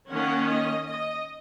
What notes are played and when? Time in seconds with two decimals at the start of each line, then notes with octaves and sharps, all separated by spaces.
0.10 D#3 A#3 C#4 F#5
0.48 D#5
0.86 D#5